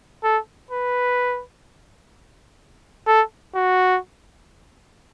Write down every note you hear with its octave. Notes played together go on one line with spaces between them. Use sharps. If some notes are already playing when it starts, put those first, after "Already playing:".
A4
B4
A4
F#4